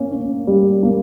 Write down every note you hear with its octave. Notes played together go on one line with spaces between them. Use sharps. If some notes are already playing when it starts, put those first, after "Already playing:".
Already playing: A#3 C#4
C#4
G3
A#3